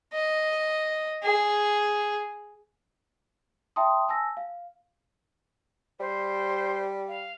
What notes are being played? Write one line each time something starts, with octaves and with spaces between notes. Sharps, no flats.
D#5
G#4
E5 G5 A5 C6 D#6
G#5 A5 E6 A#6
F5
G3 C5
F5